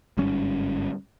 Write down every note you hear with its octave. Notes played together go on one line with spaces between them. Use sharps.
G1 G#2 G3 C#4